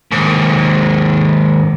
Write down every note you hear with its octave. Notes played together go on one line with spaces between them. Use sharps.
D#2 G#2